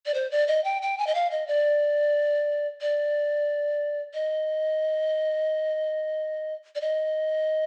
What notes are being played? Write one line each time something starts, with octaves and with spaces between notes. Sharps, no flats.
D5
C5
D5
D#5
G5
G5
G#5
D#5
F5
D#5
D5
D5
D#5
D5
D#5